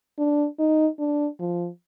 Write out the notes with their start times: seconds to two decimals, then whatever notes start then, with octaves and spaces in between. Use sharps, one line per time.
0.18 D4
0.59 D#4
0.99 D4
1.40 F3